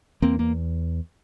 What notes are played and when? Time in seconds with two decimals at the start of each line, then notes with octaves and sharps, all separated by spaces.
0.22 E2 A#3 C4
0.39 A#3